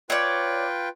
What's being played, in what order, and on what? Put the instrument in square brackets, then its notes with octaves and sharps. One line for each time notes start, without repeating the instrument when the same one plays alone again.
[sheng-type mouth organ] F4 B4 G5 [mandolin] C#5 D5